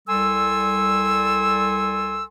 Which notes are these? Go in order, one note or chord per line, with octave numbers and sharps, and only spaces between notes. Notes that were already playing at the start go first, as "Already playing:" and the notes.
C2 G3 A4 G#5 C6 E6